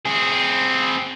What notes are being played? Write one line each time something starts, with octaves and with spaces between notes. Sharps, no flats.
C4 G#4